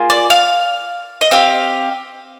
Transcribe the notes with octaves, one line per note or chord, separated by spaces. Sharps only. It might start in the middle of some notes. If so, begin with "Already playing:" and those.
Already playing: A#3 F4 G#4
D5
F5
D#5
C4 G4 F5